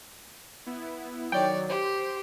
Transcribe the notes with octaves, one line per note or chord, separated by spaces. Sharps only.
B3 E4
D#3 F#3 C#5 D5 G5
G4 C5